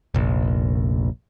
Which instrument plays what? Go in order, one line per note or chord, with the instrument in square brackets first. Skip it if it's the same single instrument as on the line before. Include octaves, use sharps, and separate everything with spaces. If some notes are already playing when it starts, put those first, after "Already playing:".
[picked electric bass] F1 A#1